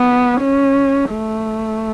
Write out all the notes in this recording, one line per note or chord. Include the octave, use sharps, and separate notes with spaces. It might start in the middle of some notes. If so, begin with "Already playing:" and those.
Already playing: B3
C#4
A3